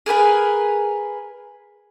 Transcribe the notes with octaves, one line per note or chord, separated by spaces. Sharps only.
G#4 A#4 B4 G#5